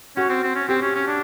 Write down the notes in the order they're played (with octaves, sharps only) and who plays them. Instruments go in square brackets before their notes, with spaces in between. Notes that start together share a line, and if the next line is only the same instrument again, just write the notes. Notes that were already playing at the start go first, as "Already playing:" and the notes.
[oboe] C#4 [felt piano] F#4
[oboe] C4
C4
C#4
[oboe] C4 [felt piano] G4
[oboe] C#4
C#4
D4